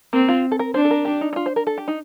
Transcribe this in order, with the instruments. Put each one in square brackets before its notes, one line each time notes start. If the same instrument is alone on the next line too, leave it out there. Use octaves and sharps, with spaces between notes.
[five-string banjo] A#3 [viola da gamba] C4
[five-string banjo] F4
A4
A#4
[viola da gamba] D4 [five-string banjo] C5
[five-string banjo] A4
A#4
G4
D#4
D#4
F4
C5
A#4
A4
G4
D#4